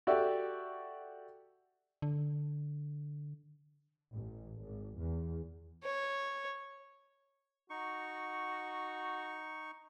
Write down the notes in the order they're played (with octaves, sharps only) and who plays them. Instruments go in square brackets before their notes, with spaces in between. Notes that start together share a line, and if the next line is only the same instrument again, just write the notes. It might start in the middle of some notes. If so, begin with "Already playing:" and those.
[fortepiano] F#4 G4 A4 D5 E5
[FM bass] D3
[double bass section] A1
G#1
E2
[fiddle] C#5
[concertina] D#4 C#6 [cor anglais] F#4